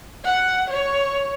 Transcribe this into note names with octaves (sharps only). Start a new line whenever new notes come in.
F#5
C#5